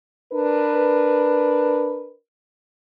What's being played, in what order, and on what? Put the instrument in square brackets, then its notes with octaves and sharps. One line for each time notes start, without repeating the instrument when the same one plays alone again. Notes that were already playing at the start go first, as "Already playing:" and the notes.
[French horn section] D4 A#4 B4